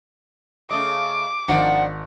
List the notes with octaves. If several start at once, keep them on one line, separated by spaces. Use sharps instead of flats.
C#3 A3 D#5 D6
G#1 D#3 F3 D4 F#5